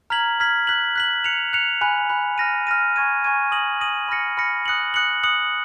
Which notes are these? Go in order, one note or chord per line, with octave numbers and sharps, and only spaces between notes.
A#5 F6 G#6 B6 F#7
A#5 F6 G#6 B6 F#7
F#6 B6 F#7
F#6 B6 F#7
F#6 C#7 F7
F#6 C#7 F7
G#5 B5 F#6
G#5 B5 F#6
F6 A#6 D#7
F6 A#6 D#7
G#5 C#6 G#6 D#7
G#5 C#6 G#6 D#7
D#6 A#6 D#7 F#7
D#6 A#6 D#7 F#7
B5 F6 A#6 C#7
B5 F6 A#6 C#7
D#6 F#6 C#7 F#7
D#6 F#6 C#7 F#7
D#6 F#6 C#7 F#7